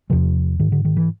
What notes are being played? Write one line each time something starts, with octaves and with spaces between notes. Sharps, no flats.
E2 C3 F3
G#2 D#3
D3
D#3
E3